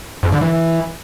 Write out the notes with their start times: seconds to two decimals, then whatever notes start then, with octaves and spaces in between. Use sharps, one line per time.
0.23 F2
0.32 D3
0.41 E3